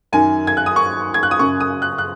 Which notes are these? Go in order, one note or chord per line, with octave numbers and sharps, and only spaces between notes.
F#2 D#3 G#5
G#6
F#6
D#6
C#6
G#6
F#6
D#6
F#2 C#3 C#6
D#6
F#6
F#6